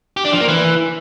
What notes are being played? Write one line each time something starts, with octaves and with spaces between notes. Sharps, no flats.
G4
D4
F3
A#3
E3